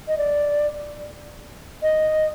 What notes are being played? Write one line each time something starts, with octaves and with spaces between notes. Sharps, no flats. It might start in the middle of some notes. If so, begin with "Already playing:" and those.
D#5
D5
D#5